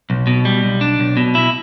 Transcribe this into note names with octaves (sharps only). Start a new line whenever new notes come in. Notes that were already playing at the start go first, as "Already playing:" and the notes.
B1
B2
G3
B1
D4
B1
B2
E4